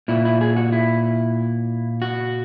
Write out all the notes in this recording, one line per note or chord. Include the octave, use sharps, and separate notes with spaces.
A#2 E4
E4
G#4
F#4
E4
F#4